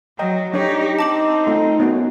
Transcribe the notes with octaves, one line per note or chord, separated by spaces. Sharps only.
F#3 D#5 G5 A#5
D4 D#4 G4 C#5 D#5
C4 D#4 A5 D6 F#7
A3 F4
F#2 B3 D#4 F#4